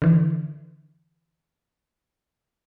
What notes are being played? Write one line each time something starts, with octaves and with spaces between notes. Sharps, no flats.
D3 E3